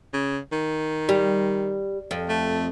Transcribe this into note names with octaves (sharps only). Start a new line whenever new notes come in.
C#3
D#3
G3
F2
A3